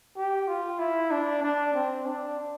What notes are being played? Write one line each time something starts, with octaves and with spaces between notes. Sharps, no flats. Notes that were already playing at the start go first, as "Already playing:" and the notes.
G4
F4
E4
D4
D4
C4
D4